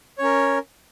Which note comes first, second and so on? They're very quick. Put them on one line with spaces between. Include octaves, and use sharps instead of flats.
C#5 C#4 A#4